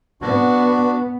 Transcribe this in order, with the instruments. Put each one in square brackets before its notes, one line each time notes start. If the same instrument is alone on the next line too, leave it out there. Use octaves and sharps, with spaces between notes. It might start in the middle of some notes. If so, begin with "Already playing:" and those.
[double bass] B3 [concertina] D4 F#4